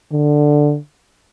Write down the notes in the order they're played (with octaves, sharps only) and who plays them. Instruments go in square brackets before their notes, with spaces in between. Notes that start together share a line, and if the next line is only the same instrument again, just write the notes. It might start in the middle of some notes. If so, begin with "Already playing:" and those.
[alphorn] D3